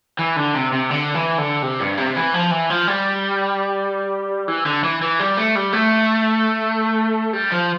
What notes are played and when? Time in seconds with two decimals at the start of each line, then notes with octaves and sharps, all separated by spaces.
0.19 E3
0.37 D3
0.54 C3
0.73 C3
0.91 D3
1.15 E3
1.38 D3
1.63 C3
1.80 G2
1.98 C3
2.16 E3
2.34 F3
2.51 E3
2.70 F3
2.87 G3
4.48 E3
4.66 D3
4.84 E3
5.02 E3
5.19 G3
5.37 A3
5.55 G3
5.73 A3
7.33 G3
7.52 F3